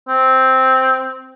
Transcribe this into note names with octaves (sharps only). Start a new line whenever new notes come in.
C4